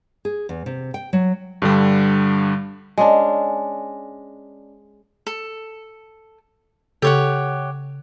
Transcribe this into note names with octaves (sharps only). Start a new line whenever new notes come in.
G#4
E2
C3
G5
F#3
G2 D3 G3
G#3 C#4 D4
A4
C#3 G4 A4 C#5 F#5 E6